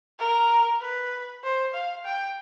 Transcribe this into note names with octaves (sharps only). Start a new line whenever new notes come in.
A#4
B4
C5
F5
G5